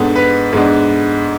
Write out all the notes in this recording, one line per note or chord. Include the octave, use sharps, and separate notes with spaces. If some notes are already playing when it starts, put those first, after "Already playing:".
Already playing: G#2 G#3 B3 D4 A4
B4
G#2 G#3 B3 D4